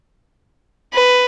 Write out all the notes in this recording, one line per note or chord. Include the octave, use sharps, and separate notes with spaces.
B4